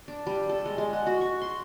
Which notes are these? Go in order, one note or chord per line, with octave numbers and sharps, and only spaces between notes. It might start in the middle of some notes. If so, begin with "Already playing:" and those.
D4
G3
A4
G#3
G#3
F#5
F#4
C#6
C6